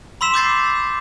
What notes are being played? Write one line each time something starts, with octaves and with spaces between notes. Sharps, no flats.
B5 C6 E6 B6 E7
D6 G6 A6 C7